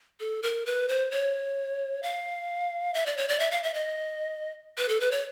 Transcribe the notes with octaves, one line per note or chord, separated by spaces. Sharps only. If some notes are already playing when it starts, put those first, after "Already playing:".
A4
A#4
B4
C5
C#5
F5
E5
D5
C#5
D5
E5
F5
E5
D#5
B4
A4
B4
C#5